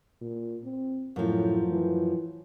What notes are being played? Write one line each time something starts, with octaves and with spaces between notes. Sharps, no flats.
A#2
C4
F#2 A2 F3
E3